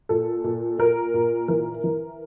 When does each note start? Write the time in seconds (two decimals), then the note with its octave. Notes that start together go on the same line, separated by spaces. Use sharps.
0.09 A#2 A4
0.44 A#2
0.79 A#2 A#4
1.14 A#2
1.48 E3 A#4
1.84 E3